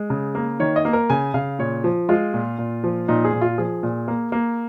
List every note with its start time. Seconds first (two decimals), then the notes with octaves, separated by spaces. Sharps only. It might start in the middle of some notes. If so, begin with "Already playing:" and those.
Already playing: G#3
0.10 C#3
0.35 A#3
0.60 D#3 C#5
0.76 D#5
0.85 A#3
0.93 A#4
1.10 C#3 G#5
1.34 C#3 F5
1.59 A#2 C#5
1.84 F3
2.09 G#3 F4
2.34 A#2
2.59 A#2
2.84 F3
3.08 A#2 D#4
3.25 G#4
3.33 A#2
3.41 F4
3.58 F3 G#4
3.83 A#2
4.08 A#3
4.32 A#3